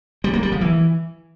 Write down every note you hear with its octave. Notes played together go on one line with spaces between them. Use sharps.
G3
A#3
G3
F3
E3